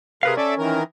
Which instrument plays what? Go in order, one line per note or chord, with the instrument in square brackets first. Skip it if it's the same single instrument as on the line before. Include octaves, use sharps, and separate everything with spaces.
[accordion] C3 A#4 [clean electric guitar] G#4 B4 F5
[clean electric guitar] C#4 [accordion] A4 D5 E5
[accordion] D#3 E3 A#4